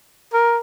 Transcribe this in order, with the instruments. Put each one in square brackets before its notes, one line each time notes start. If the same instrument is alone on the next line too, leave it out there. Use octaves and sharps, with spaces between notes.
[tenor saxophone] A#4